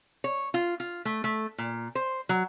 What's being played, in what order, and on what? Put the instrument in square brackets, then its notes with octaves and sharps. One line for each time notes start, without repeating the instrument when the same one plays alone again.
[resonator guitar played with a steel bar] C#5
F4
F4
A3
A3
A#2
C5
F#3